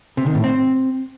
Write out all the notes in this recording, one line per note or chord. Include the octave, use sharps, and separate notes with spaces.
C3
D#3
A2
C4